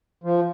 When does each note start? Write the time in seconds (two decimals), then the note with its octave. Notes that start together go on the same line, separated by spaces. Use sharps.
0.24 F3